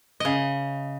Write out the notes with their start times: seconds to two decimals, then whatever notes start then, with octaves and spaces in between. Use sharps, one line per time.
0.20 C#3 D#5